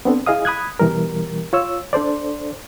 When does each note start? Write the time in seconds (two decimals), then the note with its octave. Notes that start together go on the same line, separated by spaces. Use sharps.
0.05 B3 C4 D4 A4
0.26 E4 G#4 D#5 F5 D#6
0.45 B5 D#6 F#6 G#6
0.80 B2 E3 G3 A#4
1.53 F4 C#5 E6
1.93 D4 A4 C5 D5